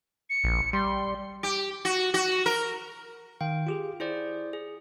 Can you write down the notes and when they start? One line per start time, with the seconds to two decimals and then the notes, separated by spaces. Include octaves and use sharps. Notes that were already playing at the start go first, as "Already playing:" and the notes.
0.30 C#7
0.44 A#1
0.73 G3 C6
1.43 G4
1.85 F#4
2.14 F#4
2.46 A#4
3.41 D#3 F5 G5
3.67 F4 G4 G#4
4.00 E4 G#4 C5 D5
4.53 G#4